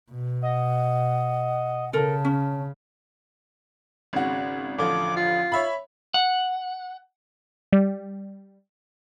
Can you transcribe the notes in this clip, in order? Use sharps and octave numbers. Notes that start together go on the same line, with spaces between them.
B2
D#5 F#5
C#3 A4 A#4 A5
C#4
G#1 C#3 F#4
A1 D3 F3 D6
F4
C#5 E5 B5
F#5
G3